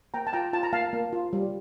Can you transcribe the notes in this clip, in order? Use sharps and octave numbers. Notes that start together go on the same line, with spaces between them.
A#3 G5 A#5
A5
F4 G5 A#5
F4 A5
A#5
A#3 F5 A5
A#3
F4
G3